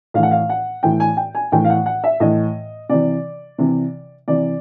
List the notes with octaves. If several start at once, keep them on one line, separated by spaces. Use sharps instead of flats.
A2 E3 F5
F#5
F5
F#5
A2 E3 G5
G#5
G5
G#5
A2 E3 G5
F5
F#5
F#5
E5
A2 E3 D#5
C3 E3 D5
C3 E3
C3 E3 D5